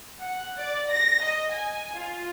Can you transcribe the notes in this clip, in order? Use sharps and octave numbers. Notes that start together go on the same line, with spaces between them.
F#5
D5
A#6
D#5
G#5
F4